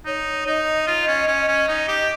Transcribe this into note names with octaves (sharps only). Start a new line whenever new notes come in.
D#4 C#5
D#4 D#5
F4
C#4
C#4
C#4
D#4
G4